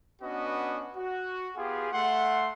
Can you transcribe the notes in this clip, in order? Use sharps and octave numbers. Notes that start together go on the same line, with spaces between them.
B3 C#4 D4 F#4 B4 D#5
F#4
B3 F4 G4 G#4
A3 F#5 C6